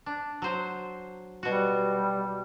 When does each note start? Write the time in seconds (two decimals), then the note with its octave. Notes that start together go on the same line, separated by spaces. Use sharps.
0.06 D4
0.42 F#3 C5
1.43 B2 G3 F#4